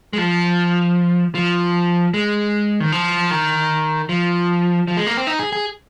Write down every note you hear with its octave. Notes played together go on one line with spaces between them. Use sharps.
G#3
F3
F3
G#3
D#3
F3
D#3
F3
F3
G#3
A#3
C4
D#4
G#4
G#4